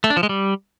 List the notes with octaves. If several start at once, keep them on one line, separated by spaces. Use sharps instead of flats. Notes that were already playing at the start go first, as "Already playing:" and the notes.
A3
D4
F3
G#3
G3